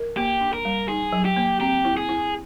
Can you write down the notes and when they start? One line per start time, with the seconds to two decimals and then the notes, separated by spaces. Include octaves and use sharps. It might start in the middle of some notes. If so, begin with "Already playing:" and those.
Already playing: A#4
0.17 A#3 G4
0.41 D4
0.53 A#4
0.65 G3
0.88 D#4 G#4
1.13 F#3
1.25 G4
1.36 A#3
1.60 C4 G4
1.85 E4
1.97 G#4
2.09 E4